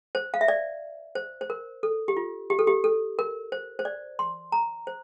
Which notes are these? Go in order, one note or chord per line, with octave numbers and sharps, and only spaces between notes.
C5
F5
E5
D5
C5
C5
A#4
A4
G4
F4
G4
A4
G4
A4
A#4
C5
C5
D5
C6
A#5
C5